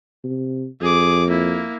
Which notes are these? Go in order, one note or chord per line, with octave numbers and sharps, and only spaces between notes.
C3
F2 G#4 D6
A#3 E4